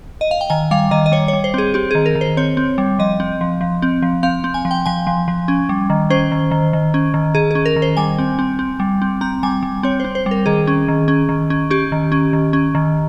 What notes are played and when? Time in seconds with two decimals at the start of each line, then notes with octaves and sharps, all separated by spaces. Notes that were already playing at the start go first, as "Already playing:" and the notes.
0.21 D#5
0.31 F5
0.41 G5
0.50 D#3 G#5
0.71 G3 F5
0.91 D#3 D#5
1.06 D#5
1.12 G3 C#5
1.28 C#5
1.33 G3
1.44 C5
1.54 C4 G#4
1.74 C4 G4
1.91 D#3 G#4
2.06 A#4
2.15 D#3
2.21 C5
2.37 C4 C#5
2.57 C4
2.78 G3
2.99 F3 D#5
3.20 C4
3.41 F3
3.61 F3
3.82 C4
4.02 F3
4.23 C4 F5
4.44 C4
4.54 G#5
4.65 F3
4.71 G5
4.86 F3 G#5
5.07 F3
5.28 F3
5.48 C#4
5.69 G3
5.90 D#3
6.10 C#4 C5
6.32 D#3
6.51 D#3
6.73 D#3
6.94 C#4
7.14 D#3
7.35 D#3 G#4
7.51 C#4 G#4
7.66 A#4
7.76 D#3
7.82 C5
7.97 G3 G#5
8.18 C4
8.39 C4
8.59 C4
8.80 G3
9.02 C4
9.21 C4 A#5
9.43 G3 G#5
9.63 G3
9.83 C4 C#5
10.00 C4 C5
10.15 C5
10.26 G3
10.31 A#4
10.46 D#3 G#4
10.67 C#4
10.88 D#3
11.08 C#4
11.29 D#3
11.50 C#4
11.70 C#4 G4
11.92 D#3
12.12 C#4
12.33 D#3
12.53 C#4
12.75 D#3